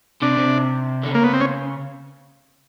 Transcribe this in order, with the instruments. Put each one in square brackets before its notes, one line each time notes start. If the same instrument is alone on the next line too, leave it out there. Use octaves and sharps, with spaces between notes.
[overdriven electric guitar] C3 [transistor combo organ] D4
[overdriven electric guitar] C3
D3
[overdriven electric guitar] C#3 [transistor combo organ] A#3
[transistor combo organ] B3
C4
C#4